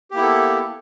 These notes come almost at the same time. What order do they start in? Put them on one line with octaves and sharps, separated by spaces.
G4 A#3 E4 B3 A4